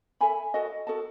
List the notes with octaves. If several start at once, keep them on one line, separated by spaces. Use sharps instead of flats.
A4 E5 G#5 B5
F#4 A4 D#5 A5
F#4 A4 D#5 A5